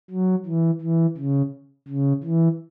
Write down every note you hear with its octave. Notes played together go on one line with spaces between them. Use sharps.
F#3
E3
E3
C#3
C#3
E3